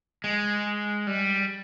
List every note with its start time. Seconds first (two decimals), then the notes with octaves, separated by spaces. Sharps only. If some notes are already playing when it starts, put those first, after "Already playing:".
0.24 G#3
1.07 G3